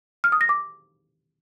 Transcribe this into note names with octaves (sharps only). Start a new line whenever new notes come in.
F6
D#6
A#6
D6